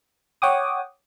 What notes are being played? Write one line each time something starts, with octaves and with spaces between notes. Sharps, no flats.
C#5 F#5 G5 D6 D#6